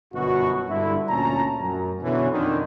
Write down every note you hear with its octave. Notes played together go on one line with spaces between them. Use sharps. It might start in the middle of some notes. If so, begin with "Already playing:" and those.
G1 F#2 B2 F#4
G2 D3 E4
D2 A#2 C#4 A5 A#5
F#2
B2 D3 E3 C#4
F2 D3 D#3